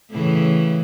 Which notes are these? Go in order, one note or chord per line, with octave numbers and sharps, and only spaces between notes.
A2 C#3 E3